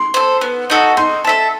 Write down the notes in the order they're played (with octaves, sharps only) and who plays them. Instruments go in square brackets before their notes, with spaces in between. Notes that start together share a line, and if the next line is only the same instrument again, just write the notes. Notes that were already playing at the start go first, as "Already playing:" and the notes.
Already playing: [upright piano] C6
[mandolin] A4 C5
B3
D#4 F#4 A4
[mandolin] D#4 [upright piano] C6
[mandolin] A4 E5 A5